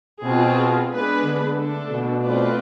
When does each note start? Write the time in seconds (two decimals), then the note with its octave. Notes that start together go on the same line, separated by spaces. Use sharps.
0.23 B2 C4 F4 G#4
0.90 G#3 B3 D4 G#4 B4
1.23 D3
1.55 A3 D4 A4
1.89 B2
2.22 A3 C4 F4 B4 D5